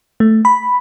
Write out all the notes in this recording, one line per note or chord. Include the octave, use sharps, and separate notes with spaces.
A3
B5